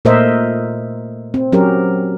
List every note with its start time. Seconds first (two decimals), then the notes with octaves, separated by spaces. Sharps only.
0.05 A#2 A3 A#4 C5 D#5 E5
1.34 C4
1.52 F#3 C#4 G4 A#4